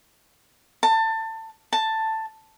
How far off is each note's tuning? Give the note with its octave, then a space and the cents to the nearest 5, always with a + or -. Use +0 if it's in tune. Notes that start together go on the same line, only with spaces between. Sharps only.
A5 +25
A5 +10